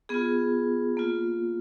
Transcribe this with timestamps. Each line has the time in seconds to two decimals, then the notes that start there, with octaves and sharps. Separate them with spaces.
0.09 B3 F4 G#4
0.97 A#3 F4